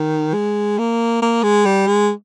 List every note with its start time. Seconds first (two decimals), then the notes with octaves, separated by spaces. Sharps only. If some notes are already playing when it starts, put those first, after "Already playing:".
Already playing: D#3
0.34 G#3
0.79 A#3
1.22 A#3
1.43 G#3
1.65 G3
1.87 G#3